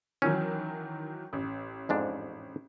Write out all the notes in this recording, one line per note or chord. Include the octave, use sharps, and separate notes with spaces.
D#3 E3 F#3 C#4
A1
F2 G#2 D4